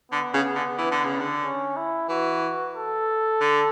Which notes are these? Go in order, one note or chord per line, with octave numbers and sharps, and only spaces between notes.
D3 B3
C#3
D3
E3
D3
C#3
D3
C#4
E4
E3 F#4
A4
D3